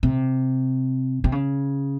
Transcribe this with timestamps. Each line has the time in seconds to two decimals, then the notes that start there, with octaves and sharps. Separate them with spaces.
0.03 C3
1.24 C3
1.32 C#3